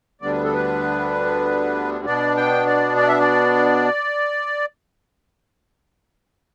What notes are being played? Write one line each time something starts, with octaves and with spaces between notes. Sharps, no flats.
D2 D3 G3 B3 D4 D5
B4
A4
B4
B2 B3 D4 D5
G5
D5
D5
E5
D5